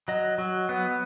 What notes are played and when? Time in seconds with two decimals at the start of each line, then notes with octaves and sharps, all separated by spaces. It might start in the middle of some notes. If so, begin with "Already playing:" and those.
0.08 F#3 D#5
0.38 F#3
0.69 B3